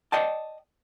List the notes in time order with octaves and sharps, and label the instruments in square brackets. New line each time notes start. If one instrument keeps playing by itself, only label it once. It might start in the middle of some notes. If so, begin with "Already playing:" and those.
[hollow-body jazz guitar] D5 D#5 G5 A5